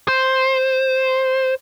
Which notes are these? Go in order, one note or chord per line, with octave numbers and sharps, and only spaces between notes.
C5